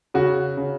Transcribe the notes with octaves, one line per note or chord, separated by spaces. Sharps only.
C#3 F#4
C#3